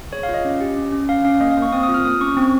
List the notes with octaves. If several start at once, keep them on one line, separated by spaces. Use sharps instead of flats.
G#4 C#5
F5
F4
D#5
C#4
G4
C#4
C#4
C#4 F5
C#4 F5
A#3 D#5
F5
A#3 C#6
C4 D#6
D#6
F4
F6
A#3 D#6
C#4 C#6
C4